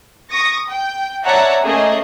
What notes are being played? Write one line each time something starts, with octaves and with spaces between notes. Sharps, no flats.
C#6 D#6 A#6
G5
C#5 D5 E5 F#5 A5 A#5
A3 A#3 C#4 G#4 D#5